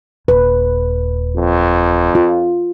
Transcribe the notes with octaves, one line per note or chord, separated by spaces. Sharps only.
D#1 B4
F2
F4